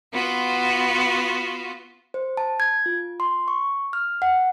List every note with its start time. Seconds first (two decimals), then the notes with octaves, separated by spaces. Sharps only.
0.13 B3 F4 F#4
2.14 C5
2.37 A5
2.60 G#6
2.86 F4
3.20 C6
3.48 C#6
3.93 F6
4.22 F#5